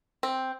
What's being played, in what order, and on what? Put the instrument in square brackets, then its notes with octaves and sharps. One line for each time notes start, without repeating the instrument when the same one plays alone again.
[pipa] C4